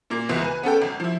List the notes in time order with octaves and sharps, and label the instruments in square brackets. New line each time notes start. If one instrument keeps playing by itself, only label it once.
[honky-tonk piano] A#2 A#3
C#2 B2 E3
B4 G#5
B3 C#4 A4 G5
G#1
F3 E4